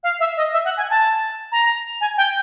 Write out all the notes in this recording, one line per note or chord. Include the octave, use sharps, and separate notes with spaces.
F5
E5
D#5
E5
F#5
G#5
A5
A#5
G#5
G5